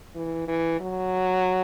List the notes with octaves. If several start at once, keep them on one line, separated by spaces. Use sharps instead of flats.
E3
E3
F#3